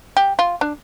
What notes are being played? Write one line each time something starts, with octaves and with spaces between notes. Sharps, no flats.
G4
F4
D4